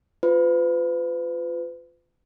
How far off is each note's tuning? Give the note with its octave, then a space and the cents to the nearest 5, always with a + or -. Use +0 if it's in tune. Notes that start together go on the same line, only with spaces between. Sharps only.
F4 +0 B4 +40